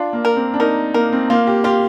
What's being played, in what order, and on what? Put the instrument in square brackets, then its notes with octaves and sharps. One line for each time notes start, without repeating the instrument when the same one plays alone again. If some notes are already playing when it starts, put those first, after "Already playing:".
Already playing: [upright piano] D4 [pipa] F4
[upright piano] A#3
[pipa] A#4
[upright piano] C4
D4
[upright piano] D#4 [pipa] A#4
[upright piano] A#3 [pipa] A#4
[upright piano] C4
[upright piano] A#3 [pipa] F4
[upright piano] G4
[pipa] F4 [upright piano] G4